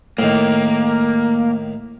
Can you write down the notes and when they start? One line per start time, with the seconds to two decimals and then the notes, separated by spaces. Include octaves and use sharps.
0.19 A2 D#3 A#3